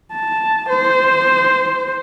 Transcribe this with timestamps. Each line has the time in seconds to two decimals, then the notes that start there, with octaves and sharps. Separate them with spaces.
0.13 A5
0.69 C5